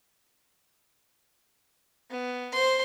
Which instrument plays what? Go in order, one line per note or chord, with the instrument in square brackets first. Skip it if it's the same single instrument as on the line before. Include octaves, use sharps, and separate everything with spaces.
[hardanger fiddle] B3
C5 C6